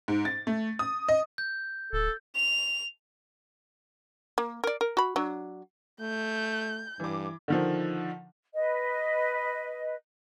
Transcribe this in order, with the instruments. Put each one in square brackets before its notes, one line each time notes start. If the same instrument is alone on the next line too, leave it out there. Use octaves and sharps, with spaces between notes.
[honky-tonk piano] G#2
A6
A3
D#6
D#5
[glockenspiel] G6
[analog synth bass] D1 [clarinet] A4
[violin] F7
[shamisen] A#3
A#4 D5
A#4
F#4 B5
F#3 D4
[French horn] A3 [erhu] G6
[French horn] G2 [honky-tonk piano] E3 D6
[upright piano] D3 D#3 F3
[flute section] B4 D#5